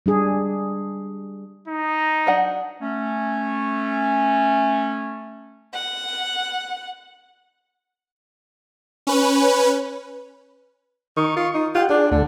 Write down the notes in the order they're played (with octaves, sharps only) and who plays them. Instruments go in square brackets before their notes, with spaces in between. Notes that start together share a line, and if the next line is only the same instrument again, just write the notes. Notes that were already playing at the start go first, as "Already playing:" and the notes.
[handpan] G3 D4 G#4
[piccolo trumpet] D#4
[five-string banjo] F#3 D4 F#5
[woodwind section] A3 C#4
[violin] F#5
[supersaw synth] C#4 B4
[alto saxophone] D#3 [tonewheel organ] C#6
[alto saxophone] F4
D#4
[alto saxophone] F4 [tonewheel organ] G4 F#5 G5
[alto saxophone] D4 [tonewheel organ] G#4 D5
[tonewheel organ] D#2 A3 A4 [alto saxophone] D3